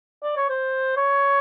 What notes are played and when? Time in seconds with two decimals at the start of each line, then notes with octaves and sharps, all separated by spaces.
0.23 D5
0.37 C#5
0.49 C5
0.96 C#5